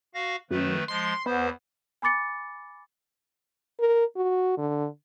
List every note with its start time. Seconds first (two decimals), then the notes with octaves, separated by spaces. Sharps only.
0.14 F#4 F5 A#6
0.51 F#2 D#3 A3 B4
0.88 F3 G#3 C6
1.26 E2 B3 C5
2.02 G#5 B5 D6 A6 C#7
3.80 A#4
4.17 F#4
4.58 D3